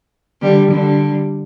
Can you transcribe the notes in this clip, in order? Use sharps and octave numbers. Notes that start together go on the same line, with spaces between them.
D3 G3
D3 G3